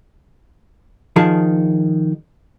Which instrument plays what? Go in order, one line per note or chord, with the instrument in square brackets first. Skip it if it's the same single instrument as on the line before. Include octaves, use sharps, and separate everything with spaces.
[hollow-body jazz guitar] D#3 F3 G#4 A5